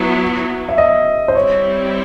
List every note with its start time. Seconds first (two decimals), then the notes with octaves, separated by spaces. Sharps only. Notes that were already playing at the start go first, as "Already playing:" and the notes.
Already playing: F#3 B3 E4
0.69 E5
0.78 D#5
1.28 C5
1.35 G3 C4 E4 C#5